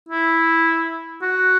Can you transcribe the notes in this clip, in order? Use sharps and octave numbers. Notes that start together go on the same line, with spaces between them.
E4
F#4